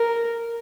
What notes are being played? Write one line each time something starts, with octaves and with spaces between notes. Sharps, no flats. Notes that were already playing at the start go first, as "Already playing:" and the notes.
Already playing: A#4